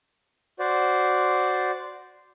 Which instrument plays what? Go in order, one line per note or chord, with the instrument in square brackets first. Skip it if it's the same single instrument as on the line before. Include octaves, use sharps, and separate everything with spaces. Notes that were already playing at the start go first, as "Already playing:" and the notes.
[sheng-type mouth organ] F#4 C5 D5